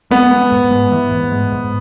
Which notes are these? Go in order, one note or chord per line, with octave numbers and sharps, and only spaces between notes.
G#3 B3
G#3
G#2
G#3
E3
G#2
G#3
G#2